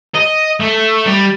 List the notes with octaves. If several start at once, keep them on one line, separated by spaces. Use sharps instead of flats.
D#5
A3
G3